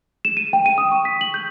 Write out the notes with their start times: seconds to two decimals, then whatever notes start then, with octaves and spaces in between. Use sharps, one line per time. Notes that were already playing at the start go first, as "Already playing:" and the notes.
0.25 E7
0.37 D#7
0.53 G5
0.66 D#7
0.78 D#6
0.91 C#6
1.05 B6
1.21 F#7
1.34 G6